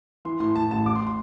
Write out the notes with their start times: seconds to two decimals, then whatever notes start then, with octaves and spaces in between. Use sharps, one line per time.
0.25 E3 C6
0.40 A2 C6
0.55 A2 A5
0.71 A1 A5
0.86 A1 D6
0.95 C6
1.07 C6